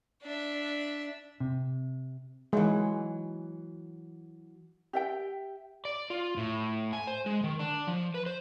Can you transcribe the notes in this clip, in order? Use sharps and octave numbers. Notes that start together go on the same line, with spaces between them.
D4 E5
C3
E3 F#3 G#3
G4 E5 G5
D5
F4
A2
G#5
C5
G#3
D#3
D4
F3
B4
C5